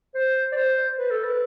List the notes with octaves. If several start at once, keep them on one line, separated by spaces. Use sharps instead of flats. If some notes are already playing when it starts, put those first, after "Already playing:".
C5
D5
C5
B4
A4
B4